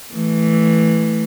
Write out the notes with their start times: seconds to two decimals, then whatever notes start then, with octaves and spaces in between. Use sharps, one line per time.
0.14 E3 A3